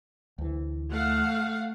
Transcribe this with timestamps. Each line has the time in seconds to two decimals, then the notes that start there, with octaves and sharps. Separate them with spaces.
0.38 D2 E3
0.92 A3 F5 F#5